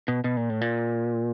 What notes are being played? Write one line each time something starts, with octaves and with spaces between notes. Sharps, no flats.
B2
B2
A#2
A2
A#2